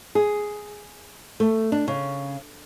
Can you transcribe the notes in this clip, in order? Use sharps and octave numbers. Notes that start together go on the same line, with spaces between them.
G#4
A3
D4
C#3